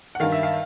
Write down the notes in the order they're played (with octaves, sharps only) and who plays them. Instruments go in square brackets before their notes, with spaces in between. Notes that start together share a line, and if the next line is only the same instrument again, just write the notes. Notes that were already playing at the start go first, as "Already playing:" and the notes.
[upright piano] F#5
G2 D#3 F5
E5
F5